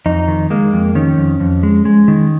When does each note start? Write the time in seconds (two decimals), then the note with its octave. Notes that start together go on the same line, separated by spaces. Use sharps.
0.06 F2 D#4
0.28 D#3
0.50 G#3 A#3
0.73 F2
0.95 D#3 C#4
1.18 F2
1.40 F2
1.63 G#3
1.85 G#3
2.08 D#3